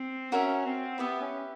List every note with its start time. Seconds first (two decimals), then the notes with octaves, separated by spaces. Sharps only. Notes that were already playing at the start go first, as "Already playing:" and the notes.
Already playing: C4
0.32 C#4 F#4 A#4 C#5 E5
0.65 C4
0.98 B3 E4 G4 B4 E5
1.20 C#4